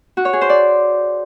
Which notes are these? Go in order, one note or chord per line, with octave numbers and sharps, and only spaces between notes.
F#4
C#5
G#4
C5
D5